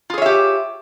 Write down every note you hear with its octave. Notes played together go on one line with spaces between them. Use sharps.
F4 G4 G#4 C#5 E5